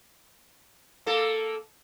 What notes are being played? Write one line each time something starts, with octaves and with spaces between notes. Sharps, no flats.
A#3 A4